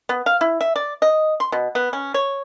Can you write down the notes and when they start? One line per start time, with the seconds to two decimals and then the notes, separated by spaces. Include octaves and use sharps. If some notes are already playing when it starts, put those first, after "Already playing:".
0.09 B3
0.26 F5
0.41 E4
0.61 E5
0.76 D5
1.02 D#5
1.40 C6
1.52 B2
1.75 B3
1.93 C#4
2.14 C#5